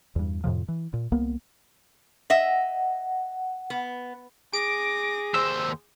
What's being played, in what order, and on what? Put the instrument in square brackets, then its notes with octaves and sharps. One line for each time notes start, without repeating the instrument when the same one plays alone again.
[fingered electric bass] E2 G2
F2 A2 C3 F3
E3
A#2
C2 A#3 B3
[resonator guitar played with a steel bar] D#5 E5 [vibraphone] F#5
[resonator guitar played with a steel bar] B3
[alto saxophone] G#4 [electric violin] D6 A#6 [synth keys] D7
[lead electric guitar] D#2 C5 [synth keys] E6